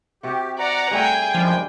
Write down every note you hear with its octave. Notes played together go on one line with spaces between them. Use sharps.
C3 F#4 G4
D5 F#5 A#5
G3 A3 G#4 E5 G5
F#2 F3 G3 G#3 D4